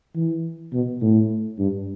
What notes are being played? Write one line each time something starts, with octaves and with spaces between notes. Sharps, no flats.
E3
B2
A2
G2